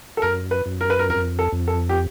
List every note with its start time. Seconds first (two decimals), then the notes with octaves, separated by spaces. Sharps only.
0.17 A4
0.22 F#2 A#4
0.51 B4
0.66 F#2
0.81 A#4
0.90 B4
0.99 A#4
1.10 F2 A#4
1.39 A4
1.53 F2
1.68 A4
1.89 G4